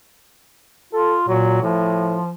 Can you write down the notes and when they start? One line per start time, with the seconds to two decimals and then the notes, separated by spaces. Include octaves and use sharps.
0.93 F4 A4
1.28 A#2 F#3
1.62 A2 F3